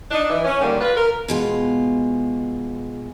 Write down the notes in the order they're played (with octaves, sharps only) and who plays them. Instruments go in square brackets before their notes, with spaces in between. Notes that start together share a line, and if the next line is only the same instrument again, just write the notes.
[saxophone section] D4 D#4
E3
C#4
D3 D#3 G3 A#3
F4 B4
A#4
[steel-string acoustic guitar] B2 G#3 F4